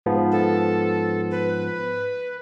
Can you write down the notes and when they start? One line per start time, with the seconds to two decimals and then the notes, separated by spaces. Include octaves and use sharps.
0.06 G#2 F3 B3
0.32 A4
1.31 B4